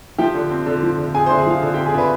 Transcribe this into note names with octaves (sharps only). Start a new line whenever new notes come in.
F3 G4 G5
D3
C4
D3
F3
D3
C4 G#4 G#5
D3 C5 C6
G#4 G#5
F3 F5
D3
C4 G4 G5
G#4 G#5
D3 B4 B5